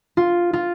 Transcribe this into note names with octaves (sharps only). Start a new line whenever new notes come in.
F4
F4